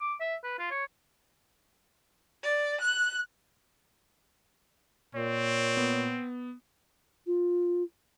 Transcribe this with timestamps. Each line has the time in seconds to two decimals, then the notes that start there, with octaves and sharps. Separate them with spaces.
0.01 D6
0.20 E5
0.43 B4
0.59 F4
0.71 C#5
2.44 D5
2.81 F#6
5.15 A#2 C4 C#5
5.77 B3
7.27 F4